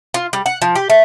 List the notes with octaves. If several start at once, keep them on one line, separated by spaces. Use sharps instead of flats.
F4
G3
F#5
F3
G4
A3